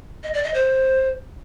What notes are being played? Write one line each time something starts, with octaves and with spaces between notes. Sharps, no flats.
D#5
D5
D#5
C5